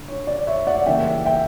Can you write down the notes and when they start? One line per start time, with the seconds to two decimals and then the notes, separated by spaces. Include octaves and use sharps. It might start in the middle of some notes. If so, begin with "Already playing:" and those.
Already playing: D3
0.08 C#5
0.27 D5
0.47 C#5 E5
0.67 D5 F#5
0.86 C#3 E3 G3 A#3 C#4 E5 G5
1.25 E5 G5